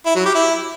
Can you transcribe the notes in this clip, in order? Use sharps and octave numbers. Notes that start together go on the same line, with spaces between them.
E4
F#3
G4
E4